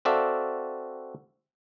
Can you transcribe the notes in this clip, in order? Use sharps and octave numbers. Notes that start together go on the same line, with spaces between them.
C4 F#4 A4 D5 E5 F5